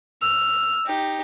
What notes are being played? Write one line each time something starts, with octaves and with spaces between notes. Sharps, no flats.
E6 F6
D#4 G4